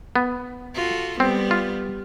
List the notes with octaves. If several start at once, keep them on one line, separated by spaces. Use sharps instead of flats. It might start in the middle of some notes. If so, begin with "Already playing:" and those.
B3
F4 F#4 A4
G3 B3 C4
F4